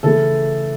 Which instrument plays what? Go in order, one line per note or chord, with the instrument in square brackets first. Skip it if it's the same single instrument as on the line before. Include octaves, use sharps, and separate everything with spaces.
[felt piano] C#3 E3 A3 A4